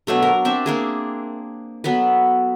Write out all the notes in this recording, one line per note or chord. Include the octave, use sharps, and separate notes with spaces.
B2 F#3 A3 D4
A#4
C4 D4 E5
A#3 D4 G#4
F#3 B3 A4 B4